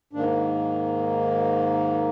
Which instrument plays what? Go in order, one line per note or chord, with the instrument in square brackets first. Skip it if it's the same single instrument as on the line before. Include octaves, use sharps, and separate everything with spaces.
[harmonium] G#2 D#3 A#3 D4